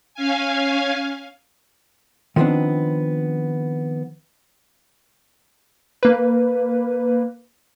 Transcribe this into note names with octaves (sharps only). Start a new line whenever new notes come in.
C#4 F5 G#5
D#3 F3 A3 B3 C4 D4
A#3 B4